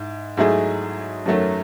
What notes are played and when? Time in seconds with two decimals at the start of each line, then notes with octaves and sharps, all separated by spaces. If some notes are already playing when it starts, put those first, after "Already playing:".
Already playing: G#2 E4
0.37 G#2 F#3 A3 E4 G#4
1.26 F#2 D#3 F#3 A3 C#4